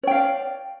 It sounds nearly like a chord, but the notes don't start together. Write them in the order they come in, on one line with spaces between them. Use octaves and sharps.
C#5 G5 F5 D5